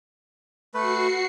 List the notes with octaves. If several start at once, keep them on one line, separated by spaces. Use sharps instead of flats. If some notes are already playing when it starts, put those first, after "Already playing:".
A3 F#4 B4 C7 C#7